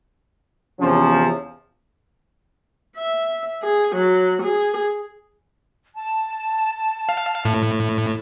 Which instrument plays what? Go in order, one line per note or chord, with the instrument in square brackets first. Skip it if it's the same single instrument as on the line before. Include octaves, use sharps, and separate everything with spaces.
[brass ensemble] E2 C3 F3 C#4
[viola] E5
G#4
F#3
G#4
[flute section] A5
[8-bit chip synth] F5
A2